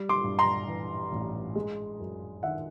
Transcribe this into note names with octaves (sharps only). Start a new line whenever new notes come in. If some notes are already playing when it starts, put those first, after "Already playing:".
Already playing: G3
C6 D6
G2
A#5 C6
E3
A1
G#3
F#2
D#3 E5 F#5